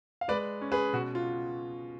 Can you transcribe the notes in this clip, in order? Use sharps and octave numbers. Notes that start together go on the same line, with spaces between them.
F5
G#3 B4 D5
C#4
G#4 B4
B2 F#4
F4